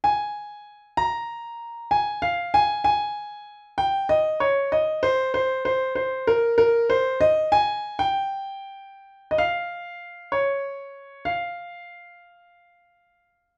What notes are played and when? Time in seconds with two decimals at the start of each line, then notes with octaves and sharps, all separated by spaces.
0.04 G#5
0.97 A#5
1.91 G#5
2.22 F5
2.54 G#5
2.84 G#5
3.78 G5
4.09 D#5
4.40 C#5
4.72 D#5
5.03 C5
5.34 C5
5.65 C5
5.95 C5
6.27 A#4
6.58 A#4
6.90 C5
7.21 D#5
7.52 G#5
7.99 G5
9.31 D#5
9.38 F5
10.32 C#5
11.25 F5